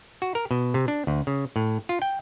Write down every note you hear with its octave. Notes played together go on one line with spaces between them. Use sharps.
F#4
A#4
B2
C3
D4
D2
C#3
A2
F4
G5